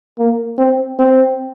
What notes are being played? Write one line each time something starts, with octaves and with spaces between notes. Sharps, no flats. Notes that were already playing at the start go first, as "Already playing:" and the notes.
A#3
C4
C4